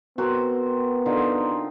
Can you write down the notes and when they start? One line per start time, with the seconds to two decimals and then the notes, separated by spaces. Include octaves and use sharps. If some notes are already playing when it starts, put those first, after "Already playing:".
0.18 B3 C4 F#4 A#4
1.06 D3 D#4 F4